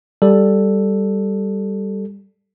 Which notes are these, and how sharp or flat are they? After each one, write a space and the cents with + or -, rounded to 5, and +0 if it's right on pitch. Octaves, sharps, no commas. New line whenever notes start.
G3 +0 A4 +0